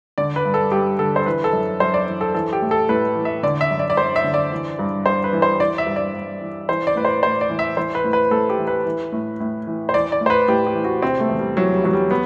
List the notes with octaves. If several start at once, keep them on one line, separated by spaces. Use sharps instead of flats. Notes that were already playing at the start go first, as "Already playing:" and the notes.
D3 D5
B4
G2
A4
G2 G4
D3 A4
C5
E3 B4
A4
F#2
F#2 C5
D5
E3
A4
E3 A4
G4
A2
A4
A2 B4
E3
E5
D3 D5
E5
F#2
D5
D5
F#2 C5
E5
D3
D5
E3
G2
G2 C5
B4
E3
C5
E3 D5
E5
G2
D5
G2
E3
E3 C5
D5
A2 B4
C5
A2 C5
D5
E3
E5
E3 C5
B4
A2
B4
A2 A4
G4
E3
B4
E3
A2
A2
E3
C5
E3 D5
D5
A2
C5
B4
A2 G4
G4
E3
F#4
C3 C4
A3
E2
G3
E3 F#3
G3
E2 F#3
G3
B3